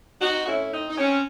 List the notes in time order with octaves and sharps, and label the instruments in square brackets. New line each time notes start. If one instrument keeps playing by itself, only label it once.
[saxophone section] C4 D#4 F#4
F#4
A2 C#4 E4
C4 D#4
D#4
C4 C#4